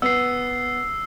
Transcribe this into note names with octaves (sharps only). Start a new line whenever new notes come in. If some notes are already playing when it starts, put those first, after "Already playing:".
B3 E6 C7